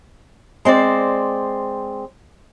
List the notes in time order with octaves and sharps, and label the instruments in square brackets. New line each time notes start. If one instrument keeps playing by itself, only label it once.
[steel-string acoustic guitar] G#3 C4 C5 D5